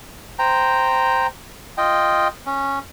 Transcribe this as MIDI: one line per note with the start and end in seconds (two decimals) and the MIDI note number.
0.39 1.27 72
0.39 1.27 79
0.39 1.27 82
1.78 2.28 65
1.78 2.28 75
1.78 2.28 79
2.46 2.79 61